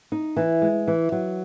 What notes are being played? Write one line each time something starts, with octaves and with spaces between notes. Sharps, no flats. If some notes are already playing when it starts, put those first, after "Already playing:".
D#4
E3
G#3
E3
F#3